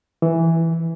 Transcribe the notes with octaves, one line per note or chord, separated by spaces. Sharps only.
E3